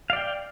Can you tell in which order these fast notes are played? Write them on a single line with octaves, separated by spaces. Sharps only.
F5 D5 G5